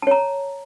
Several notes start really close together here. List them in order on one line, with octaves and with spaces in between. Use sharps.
A5 C#5 A#5